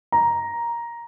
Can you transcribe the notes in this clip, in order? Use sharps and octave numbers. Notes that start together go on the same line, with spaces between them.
A#5